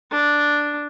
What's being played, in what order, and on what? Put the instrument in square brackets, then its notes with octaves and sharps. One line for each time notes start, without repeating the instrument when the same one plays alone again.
[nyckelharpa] D4